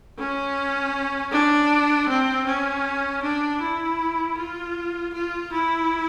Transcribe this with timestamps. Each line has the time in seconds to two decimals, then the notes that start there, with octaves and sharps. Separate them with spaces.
0.18 C#4
1.32 D4
2.09 C4
2.46 C#4
3.23 D4
3.61 E4
4.37 F4
5.14 F4
5.52 E4